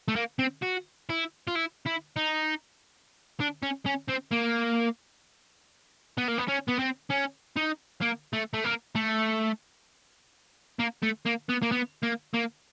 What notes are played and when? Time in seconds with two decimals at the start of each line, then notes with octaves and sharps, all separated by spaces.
0.08 A3
0.16 A#3
0.39 C4
0.63 F#4
1.09 E4
1.48 F4
1.56 E4
1.86 E4
2.16 D#4
3.40 D4
3.63 C#4
3.86 C#4
4.09 C4
4.33 A#3
6.18 B3
6.28 A#3
6.38 B3
6.48 C#4
6.68 B3
6.79 C4
7.10 C#4
7.57 D#4
8.02 A#3
8.33 A3
8.54 A3
8.64 A#3
8.95 A3
10.79 A#3
11.03 A3
11.26 A#3
11.49 B3
11.63 A#3
11.72 B3
12.03 A#3
12.34 A#3